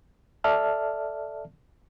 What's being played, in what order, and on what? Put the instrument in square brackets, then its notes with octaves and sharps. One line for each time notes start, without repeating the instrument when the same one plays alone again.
[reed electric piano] A4 D5 E5 A5 F6